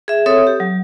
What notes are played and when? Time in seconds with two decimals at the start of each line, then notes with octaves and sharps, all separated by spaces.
0.08 G#4 E5
0.26 C4 A4 C#5 E5 D#6
0.47 G4
0.60 F#3